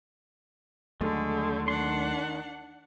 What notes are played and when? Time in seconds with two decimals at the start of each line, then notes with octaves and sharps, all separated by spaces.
1.01 D#2 D3 F#3 G#3 A3
1.68 D#3 D4 F#5 C6